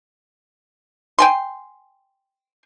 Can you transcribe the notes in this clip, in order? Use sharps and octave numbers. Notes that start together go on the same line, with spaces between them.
G5 G#5 C6